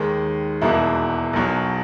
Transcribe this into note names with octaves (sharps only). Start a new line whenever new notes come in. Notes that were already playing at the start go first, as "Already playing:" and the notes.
Already playing: D#2 D#3 G#3
E1 E2 B2 A#3 E4
B1 B2 F#3